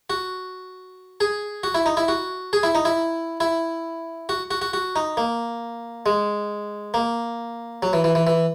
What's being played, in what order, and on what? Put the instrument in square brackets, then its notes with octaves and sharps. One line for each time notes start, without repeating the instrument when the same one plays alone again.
[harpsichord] F#4
G#4
F#4
E4
D#4
E4
F#4
G#4
E4
D#4
E4
E4
F#4
F#4
F#4
F#4
D#4
A#3
G#3
A#3
F#3
E3
E3
E3
E3